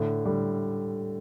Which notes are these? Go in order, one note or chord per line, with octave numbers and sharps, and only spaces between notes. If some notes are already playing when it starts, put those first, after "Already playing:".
Already playing: A2 D3
D3 G3